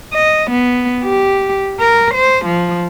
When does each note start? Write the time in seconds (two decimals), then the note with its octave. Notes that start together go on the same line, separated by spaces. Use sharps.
0.14 D#5
0.51 B3
1.04 G4
1.79 A#4
2.14 C5
2.45 F3